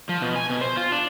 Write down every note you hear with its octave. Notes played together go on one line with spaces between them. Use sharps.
F3
B2
G#5
B2
C5
F4
D4